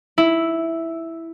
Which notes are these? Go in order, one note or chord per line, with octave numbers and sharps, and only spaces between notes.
E4